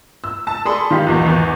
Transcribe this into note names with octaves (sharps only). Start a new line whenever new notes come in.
E6
A5
G#4 A4 D5 B5 C6
D#3 F3 F4 G4
B1 E2 A#2
G#1 E2